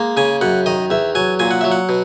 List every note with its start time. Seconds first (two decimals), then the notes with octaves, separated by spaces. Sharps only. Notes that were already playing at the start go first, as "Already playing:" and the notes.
Already playing: G#3 A#3
0.17 C#3 G#5
0.41 F#2 F#5
0.66 D#3 D#5
0.90 E2 E5
1.15 F#3 G#5
1.39 A#2 G#5
1.51 F#5
1.61 F#3 E5
1.71 F#5
1.89 B2